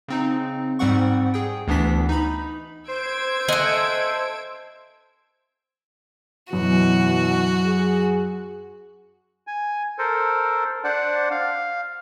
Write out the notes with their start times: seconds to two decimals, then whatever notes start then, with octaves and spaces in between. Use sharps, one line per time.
0.08 C#3 C4 D#4
0.79 G#2 G3 C4 F#5 C#6
1.34 G#4 G5
1.67 D2 E3 B3 D4 B6
2.09 D#4 B5
2.88 C5 E6 G#6 D7
3.48 A4 D#5 E5 F#5 G#5
6.53 F#2 B2 E3 F#4
7.65 G#4
9.47 G#5
9.98 A4 A#4 C5
10.84 D4 C5 D5 F#5
11.31 F5